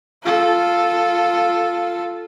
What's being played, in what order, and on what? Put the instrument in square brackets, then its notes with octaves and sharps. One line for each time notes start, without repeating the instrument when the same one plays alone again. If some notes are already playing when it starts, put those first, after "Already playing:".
[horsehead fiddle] F4 A4